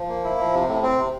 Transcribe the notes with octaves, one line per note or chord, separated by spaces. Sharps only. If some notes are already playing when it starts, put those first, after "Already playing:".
Already playing: F3
A#3
E4
F3
C3
A2
C4
C3